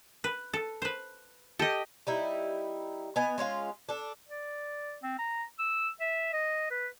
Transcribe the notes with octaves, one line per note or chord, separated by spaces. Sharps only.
B4
A4
B4 C5
G4 A4 D#5
G3 D#4 E4
B3 D#5 G#5
G#3 C#4 F4 F5
D4 A4
D5
C4
A#5
E6
E5
D#5
B4